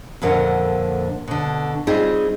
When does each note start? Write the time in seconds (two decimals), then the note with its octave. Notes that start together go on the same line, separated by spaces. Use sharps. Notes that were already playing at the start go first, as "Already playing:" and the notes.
0.22 F2 A#2 D3 A#4 F#5
1.28 B2 D3
1.87 G3 C4 D#4 F4 G#4